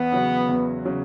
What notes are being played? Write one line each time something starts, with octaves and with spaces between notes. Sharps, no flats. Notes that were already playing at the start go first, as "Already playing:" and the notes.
Already playing: E2 B3
C#3 F#3 C#4 F#4
E2
C#3 F#3 C#4 F#4